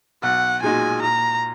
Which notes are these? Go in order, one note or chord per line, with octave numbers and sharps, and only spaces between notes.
B1 F#5
A#2 G#3 D#4 F#4 G#5
A#2 A#5